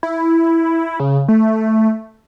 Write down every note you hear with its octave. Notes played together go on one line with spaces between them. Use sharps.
E4
C#3
A3